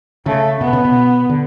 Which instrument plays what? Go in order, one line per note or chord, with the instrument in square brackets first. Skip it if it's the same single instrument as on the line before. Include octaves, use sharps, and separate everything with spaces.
[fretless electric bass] C#3 [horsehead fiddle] A3
[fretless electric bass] B2 [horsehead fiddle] B3
[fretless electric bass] C#3
B2
D3